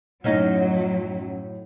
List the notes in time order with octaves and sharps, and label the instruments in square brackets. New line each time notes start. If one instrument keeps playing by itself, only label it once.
[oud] F#2 C#4 D#4 [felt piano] A2 [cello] F#3